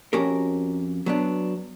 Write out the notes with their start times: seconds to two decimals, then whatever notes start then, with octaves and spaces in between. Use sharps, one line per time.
0.13 F2 C#4 F#4 G4 A#4
1.06 F#3 B3 D4